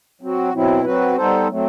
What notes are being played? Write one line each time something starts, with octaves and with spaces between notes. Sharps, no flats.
F#3 C4 F#4
B2 F#3 C4 E4
F#3 C4 F#4 B4
G3 B3 D#4 A4 C5
F#3 A3 C4